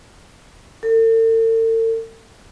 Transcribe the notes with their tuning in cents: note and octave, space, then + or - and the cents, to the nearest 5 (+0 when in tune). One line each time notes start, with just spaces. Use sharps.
A4 +45